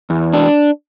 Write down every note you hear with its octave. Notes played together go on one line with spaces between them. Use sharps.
E2
D4